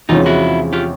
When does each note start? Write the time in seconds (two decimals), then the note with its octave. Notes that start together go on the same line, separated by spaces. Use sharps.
0.09 E2 C3 F3 G#3 C#4 D#4 F4
0.26 E4 F#4
0.73 F4 G4